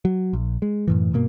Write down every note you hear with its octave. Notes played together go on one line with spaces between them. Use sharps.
F#3
A#1
G#3
F#2 A2 E3
G2 B2 A#3